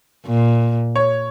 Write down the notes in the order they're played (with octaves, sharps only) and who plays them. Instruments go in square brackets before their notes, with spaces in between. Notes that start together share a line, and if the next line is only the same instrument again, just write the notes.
[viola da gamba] A#2
[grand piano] C#5